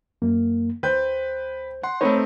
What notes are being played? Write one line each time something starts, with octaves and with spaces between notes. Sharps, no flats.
F#2 A#3
D2 B4 C5 G5 G6
F#5 C6
A3 C4 D#4 B4 C#5